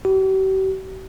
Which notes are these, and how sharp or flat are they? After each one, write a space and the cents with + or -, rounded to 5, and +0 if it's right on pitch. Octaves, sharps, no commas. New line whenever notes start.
G4 -45